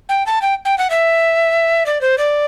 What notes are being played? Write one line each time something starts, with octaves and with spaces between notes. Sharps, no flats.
G5
A5
G5
G5
F#5
E5
D5
C5
D5